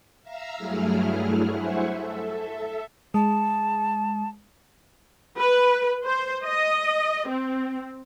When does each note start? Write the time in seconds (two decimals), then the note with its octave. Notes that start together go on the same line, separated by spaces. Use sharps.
0.22 E5 F5 A#5 E6
0.57 G2 F#3 A3 E4 G#4 F6
1.51 E4 C5 E5 F#5 G#5 C#6
1.89 A4 E5
3.14 G#3 A5
5.38 B4
6.05 C5
6.44 D#5
7.28 C4